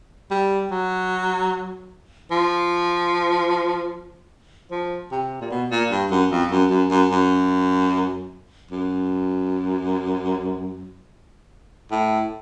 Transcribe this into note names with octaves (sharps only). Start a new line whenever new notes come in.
G3
F#3
F3
F3
C3
A#2
B2
A#2
G2
F#2
F2
F#2
F#2
F#2
F#2
F#2
A2